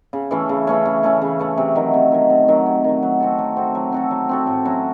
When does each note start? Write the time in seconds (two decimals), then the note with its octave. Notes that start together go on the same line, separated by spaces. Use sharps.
0.13 C#3
0.31 E3 A3 C#4
0.49 C#3
0.67 E3 A3 C#4
0.85 C#3
1.03 E3 A3 C#4
1.22 C#3
1.39 E3 A3 C#4
1.58 C3
1.76 D#3 F#3
1.94 C3
2.12 D#3 F#3
2.30 C3
2.48 D#3 F#3
2.66 C3
2.84 D#3 F#3
3.03 F#3
3.20 C4 F#4 A4
3.38 F#3
3.57 C4 F#4 A4
3.75 F#3
3.92 C4 F#4 A4
4.11 F#3
4.29 C4 F#4 A4
4.47 A2
4.65 F#3 C#4 F#4